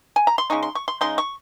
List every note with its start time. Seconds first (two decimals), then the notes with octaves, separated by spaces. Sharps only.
0.16 G#5
0.27 A#5
0.38 C6
0.50 C#3 G#3 D#4 C#6
0.63 C6
0.75 C#6
0.88 C6
1.01 C#3 G#3 D#4 C6
1.18 C#6